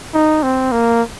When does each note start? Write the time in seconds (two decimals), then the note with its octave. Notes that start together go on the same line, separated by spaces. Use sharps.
0.14 D#4
0.43 C4
0.72 A#3